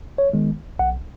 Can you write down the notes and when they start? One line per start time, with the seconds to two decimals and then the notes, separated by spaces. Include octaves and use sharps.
0.18 C#5
0.33 D#3 G#3 B3
0.79 B1 F#5